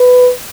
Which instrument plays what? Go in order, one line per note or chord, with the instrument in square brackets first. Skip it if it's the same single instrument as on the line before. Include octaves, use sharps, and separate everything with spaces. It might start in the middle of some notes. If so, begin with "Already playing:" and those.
Already playing: [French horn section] B4